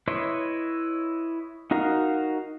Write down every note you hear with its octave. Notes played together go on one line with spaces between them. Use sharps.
E4 B4 C#5 D#5 C6
D#4 F#4 A#4 F5